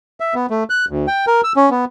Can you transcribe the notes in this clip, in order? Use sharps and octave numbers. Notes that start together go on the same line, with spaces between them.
E5
B3
A3
F#6
D2
G5
A#4
E6
C#4
B3